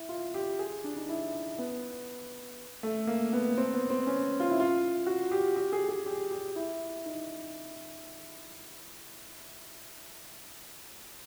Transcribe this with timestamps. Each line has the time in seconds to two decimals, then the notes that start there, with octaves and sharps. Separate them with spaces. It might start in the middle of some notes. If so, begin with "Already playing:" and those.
Already playing: E4
0.09 F4
0.34 G4
0.59 G#4
0.84 D4
0.97 D#4
1.09 E4
1.58 B3
2.83 A3
3.07 A#3
3.33 B3
3.57 C4
3.74 B3
3.90 C4
4.07 C#4
4.40 F4
4.50 E4
4.60 F4
5.06 F#4
5.31 G4
5.56 G4
5.72 G#4
5.89 G#4
6.06 G4
6.31 G4
6.56 E4
7.06 D#4